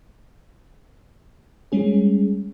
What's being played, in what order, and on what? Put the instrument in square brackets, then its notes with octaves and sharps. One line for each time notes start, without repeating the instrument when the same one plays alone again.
[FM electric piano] G3 G#3 C#4 G#4